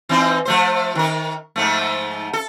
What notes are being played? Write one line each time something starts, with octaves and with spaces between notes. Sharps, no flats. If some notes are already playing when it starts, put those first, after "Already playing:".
E3 C4 D#4
F3 A3 C5
D#3 A#4
G#2 F3 A3
A4